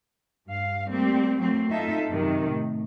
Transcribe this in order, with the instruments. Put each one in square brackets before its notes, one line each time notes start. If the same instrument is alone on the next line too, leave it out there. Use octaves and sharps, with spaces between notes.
[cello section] G2 F5
G3 A3 A#3 C4
F#3 A3 A#3 C4
D#4 F4 A4 E5
F#2 C3 D#3
A2